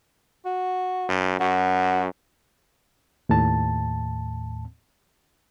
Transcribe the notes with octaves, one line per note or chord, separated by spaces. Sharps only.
F#4
F#2
F#2 F#4
D#2 A2 A5